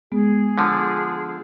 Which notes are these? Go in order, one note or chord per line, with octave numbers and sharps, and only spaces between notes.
G#3 B3 G#4
D3 F3